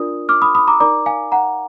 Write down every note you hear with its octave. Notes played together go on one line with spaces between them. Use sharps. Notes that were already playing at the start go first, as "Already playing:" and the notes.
Already playing: D4 F4 A#4 D5 D#6
D6 F6
B5 D#6
B5 D#6
A#5 D6
D#4 A#4 D5 A#5 D6
F5 G#5
F#5 A#5